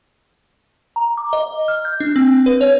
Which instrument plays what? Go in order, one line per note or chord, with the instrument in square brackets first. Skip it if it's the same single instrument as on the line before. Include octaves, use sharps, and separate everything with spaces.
[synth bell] A#5
D6
D#5
F6
G6
D4
C4
B4
C#5